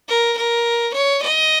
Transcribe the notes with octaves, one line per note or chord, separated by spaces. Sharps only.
A#4
A#4
C#5
D#5